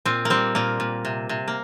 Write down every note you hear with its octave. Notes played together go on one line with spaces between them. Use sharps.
A#2 C4
A#3
G3 C4
A#2 A#3
A#2
C3
C3
A#3